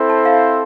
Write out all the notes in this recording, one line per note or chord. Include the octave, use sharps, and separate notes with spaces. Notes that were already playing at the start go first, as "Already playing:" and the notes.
Already playing: C4 E4 A4 C5
A5
F5